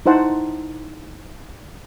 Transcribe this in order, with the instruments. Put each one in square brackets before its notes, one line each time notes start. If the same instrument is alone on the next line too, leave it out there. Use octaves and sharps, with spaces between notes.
[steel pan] D#4 E4 C5 F#5 A5